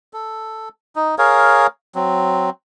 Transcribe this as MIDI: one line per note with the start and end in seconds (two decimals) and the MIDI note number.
0.13 0.69 69
0.96 1.15 63
1.18 1.67 68
1.18 1.67 70
1.18 1.67 73
1.18 1.67 77
1.95 2.50 54
1.95 2.50 60